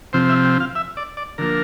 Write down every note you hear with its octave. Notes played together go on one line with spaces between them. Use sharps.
C3 F3 C4 C5
E5
G5
F5
E5
D5
D5
D3 F3 A#3 A#4